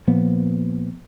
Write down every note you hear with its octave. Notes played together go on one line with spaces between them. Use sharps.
A#2 F3 A#3 B3